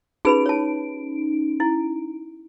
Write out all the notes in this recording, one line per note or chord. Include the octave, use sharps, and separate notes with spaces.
C#4 D#4 G#4 B4 B5 D7
C#5 A5
E4